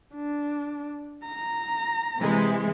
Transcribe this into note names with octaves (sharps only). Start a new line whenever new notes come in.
D4
A#5
C3 E3 G#3